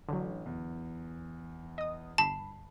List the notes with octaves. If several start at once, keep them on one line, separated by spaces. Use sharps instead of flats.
A1 D3 F#3
E2
D#5 D#6
G1 A5 B5 C7